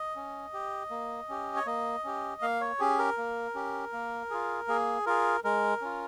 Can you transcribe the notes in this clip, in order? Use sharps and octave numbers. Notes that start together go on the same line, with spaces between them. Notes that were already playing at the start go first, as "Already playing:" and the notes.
Already playing: D#5
C#4
G4
A#3
C#4 G4
C#5
A#3 D#5
C#4 G4
A#3 F5
C#5
C#4 G4 G#4
A#4
A#3
C#4 G4
A#3
F4 G#4
A#3 G#4
F4 G#4 A#4
G#3 A#4
C#4 F4